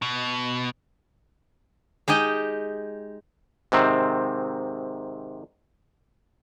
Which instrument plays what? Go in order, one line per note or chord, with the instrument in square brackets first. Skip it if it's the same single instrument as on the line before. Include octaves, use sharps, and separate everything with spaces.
[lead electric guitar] B2
[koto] G#3 D#4 G4 D#5
[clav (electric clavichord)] G#2 C3 D#3 C4